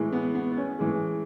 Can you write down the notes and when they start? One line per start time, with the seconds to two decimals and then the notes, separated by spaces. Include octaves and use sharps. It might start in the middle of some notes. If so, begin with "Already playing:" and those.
Already playing: A2 E3 G#3
0.12 B3
0.35 B3
0.52 B3
0.57 C#4
0.79 A2 E3 G#3